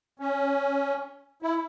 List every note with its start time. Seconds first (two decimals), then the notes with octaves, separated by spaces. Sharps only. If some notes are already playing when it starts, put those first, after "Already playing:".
0.20 C#4
1.42 E4